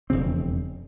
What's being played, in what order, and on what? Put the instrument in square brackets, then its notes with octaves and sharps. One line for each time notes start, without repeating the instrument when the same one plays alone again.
[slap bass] E1 F2 C#3 C4